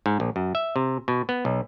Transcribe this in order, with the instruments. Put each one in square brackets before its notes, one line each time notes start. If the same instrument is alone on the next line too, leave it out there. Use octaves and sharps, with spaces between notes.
[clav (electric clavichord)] G#2
A#1
F#2
E5
C3
B2
B3
B1